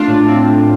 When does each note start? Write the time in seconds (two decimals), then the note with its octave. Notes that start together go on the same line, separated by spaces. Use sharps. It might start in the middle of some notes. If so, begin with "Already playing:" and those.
Already playing: A3 D4 F4
0.08 A2
0.28 C4
0.49 A2